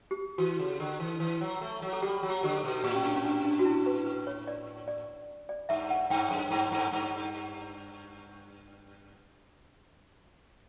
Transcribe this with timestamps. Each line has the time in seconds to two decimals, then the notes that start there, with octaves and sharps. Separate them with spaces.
0.11 G4
0.38 E3 F#4
0.60 C#3
0.80 D3
1.00 E3
1.20 E3
1.41 F#3
1.61 A3
1.82 F#3
1.93 A4
2.02 G3 G4
2.23 F#3
2.30 G4
2.43 D3 G4
2.57 A4
2.63 B2
2.84 A2 G4
2.95 C#4
3.04 D4
3.16 C#4
3.25 D4
3.45 D4
3.59 F#4
3.65 E4
3.86 B4
4.06 B4
4.27 C#5
4.47 D5
4.88 D5
5.49 D5
5.69 G2 E5
5.90 F#5
6.10 G2 G5
6.31 F#2
6.51 G2
6.72 G2
6.92 G2